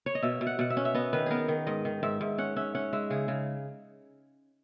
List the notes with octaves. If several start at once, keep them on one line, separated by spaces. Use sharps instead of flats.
C#5
D#5
B2 E5
B2
F#5
B2 F#5
E5
C#4
E5
B3 D#5
D#3 B4
B3 G#4 A#4
D#3
G#2 D#5
D#3
G#2 E5
G#2
C#4 F#5
C#4 E5
C#4 F#5
G#3 E5
C#3 G#4
C#3